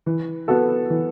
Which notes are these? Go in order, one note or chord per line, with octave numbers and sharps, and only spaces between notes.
E3
B3 F#4 A4
E3